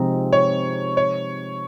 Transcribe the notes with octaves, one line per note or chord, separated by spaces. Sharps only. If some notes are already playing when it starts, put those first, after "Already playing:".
Already playing: C3 F3 G#3 C4 D#4
C#5
C#5